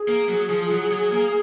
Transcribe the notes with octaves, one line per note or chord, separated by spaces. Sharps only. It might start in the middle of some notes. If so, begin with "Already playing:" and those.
Already playing: G#4
A#3
F#3
F3
F#3
F#3
A#3